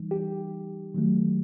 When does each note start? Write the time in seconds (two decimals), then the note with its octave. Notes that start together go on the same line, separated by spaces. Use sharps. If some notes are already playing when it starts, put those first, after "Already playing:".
Already playing: E3 G3 D#4
0.11 G4
0.94 D#3 F#3 A3